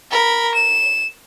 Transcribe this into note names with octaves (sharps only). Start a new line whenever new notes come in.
A#4 B5
E7